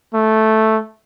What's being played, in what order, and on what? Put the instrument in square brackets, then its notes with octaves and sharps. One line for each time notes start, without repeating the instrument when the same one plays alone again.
[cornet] A3